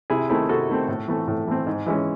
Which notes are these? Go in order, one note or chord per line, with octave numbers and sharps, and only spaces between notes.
C3 E4 G#4
D#3 A3 C4 E4 G#4
C3 F#4 A4
D#3 A3 C4
A2
E3 A3 C4
A2
E3 A3 C4
G#2
E3 G#3 C#4